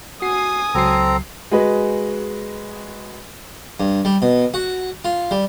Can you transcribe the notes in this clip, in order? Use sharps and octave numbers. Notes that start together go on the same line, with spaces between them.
F#4 G#5 D#6 C7
C#2 F#3 C4 A4 A#5 C7
G#3 F#4 B4 D#5
G2
G3
B2
F#4
F4
G3